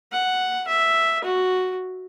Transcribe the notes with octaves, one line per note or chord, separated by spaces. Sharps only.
F#5
E5
F#4